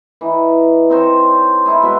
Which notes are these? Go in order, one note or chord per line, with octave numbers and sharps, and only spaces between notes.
E3 D#4
C4 D#4 C5 C#5
D#4 E4 G#4
B2 G#3 E5